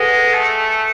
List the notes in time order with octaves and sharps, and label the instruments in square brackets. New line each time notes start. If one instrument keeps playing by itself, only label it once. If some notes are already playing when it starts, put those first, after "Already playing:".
Already playing: [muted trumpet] G#3 [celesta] G#4 A4 B4 F#5
[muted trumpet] A3 [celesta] G#5